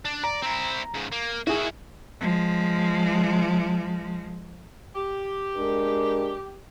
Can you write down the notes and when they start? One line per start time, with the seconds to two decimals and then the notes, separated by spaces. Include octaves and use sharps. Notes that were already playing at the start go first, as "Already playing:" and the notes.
0.05 D4
0.24 D5 A#5
0.42 C4 E4
0.94 G#2 C#3
1.12 A#3
1.47 D#3 E4 F#4 G#4
2.20 F3 G#3
4.95 G4
5.56 G#3 D4 A#4